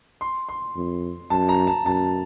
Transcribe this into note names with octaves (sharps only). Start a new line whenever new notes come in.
C6
C6
F2
F#2 A5
A#5
A5
F#2 A5